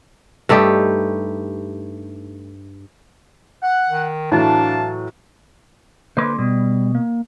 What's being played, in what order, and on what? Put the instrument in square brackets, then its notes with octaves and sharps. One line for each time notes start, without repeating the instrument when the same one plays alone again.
[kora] G2 A3 D#4 G4
[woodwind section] F#5
[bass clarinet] D#3
[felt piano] A2 E3 F#3 [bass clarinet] D4 [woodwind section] F5 A5
[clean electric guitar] D3 A#3 C6 [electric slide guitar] B4 C5
[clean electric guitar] B2 [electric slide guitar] G3
[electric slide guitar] A#3